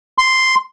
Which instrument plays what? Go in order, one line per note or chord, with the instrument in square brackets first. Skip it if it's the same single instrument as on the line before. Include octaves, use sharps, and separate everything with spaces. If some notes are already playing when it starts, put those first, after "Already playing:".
[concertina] C6